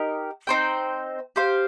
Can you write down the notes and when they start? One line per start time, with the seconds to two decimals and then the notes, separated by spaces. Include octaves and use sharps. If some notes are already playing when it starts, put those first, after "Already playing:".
Already playing: D#4 G4 A#4
0.47 C4 D#4 C5 G5
1.36 G4 C5 F5